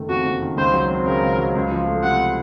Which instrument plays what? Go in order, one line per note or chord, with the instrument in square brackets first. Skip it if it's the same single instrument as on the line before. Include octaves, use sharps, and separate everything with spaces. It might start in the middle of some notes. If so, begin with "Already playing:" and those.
Already playing: [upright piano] F#1 D#3 A3
[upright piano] F2 [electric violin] F#4
[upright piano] F#1
D#3
[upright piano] C#2 [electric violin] C5
[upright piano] F#3
C4
[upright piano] C#3 [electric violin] A#4
[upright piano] C#2
F#3
C#2
F3
A3
[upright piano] C3 [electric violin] F#5